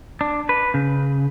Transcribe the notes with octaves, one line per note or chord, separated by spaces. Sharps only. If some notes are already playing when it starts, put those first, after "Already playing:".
D4
B4
C#3